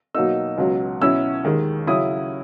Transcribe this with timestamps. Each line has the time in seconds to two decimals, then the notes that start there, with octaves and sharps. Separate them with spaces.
0.15 B2 F#3 A#3 D#4 E6
0.58 C#2 B2 F#3
1.02 B2 F#3 C#4 E4 E6
1.45 D#2 D#3 G#3
1.87 C#3 F#3 C#4 E4 D#6